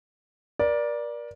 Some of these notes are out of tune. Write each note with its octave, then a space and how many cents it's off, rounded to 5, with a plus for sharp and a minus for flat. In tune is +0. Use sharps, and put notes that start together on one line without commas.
A#4 +35 D5 +0